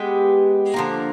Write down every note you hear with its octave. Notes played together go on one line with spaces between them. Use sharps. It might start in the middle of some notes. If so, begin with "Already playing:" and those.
Already playing: G#3 B3 G4
D3 F3 A#3